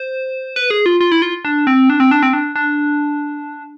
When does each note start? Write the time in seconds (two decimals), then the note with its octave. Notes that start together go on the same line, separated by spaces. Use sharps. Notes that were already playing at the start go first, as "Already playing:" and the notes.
Already playing: C5
0.56 B4
0.70 G#4
0.86 F4
1.01 F4
1.12 E4
1.22 F4
1.45 D4
1.67 C4
1.90 D4
2.00 C4
2.11 D4
2.23 C4
2.33 D4
2.56 D4